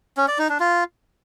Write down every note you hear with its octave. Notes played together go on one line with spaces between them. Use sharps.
C#4
D5
D#4
D4
F4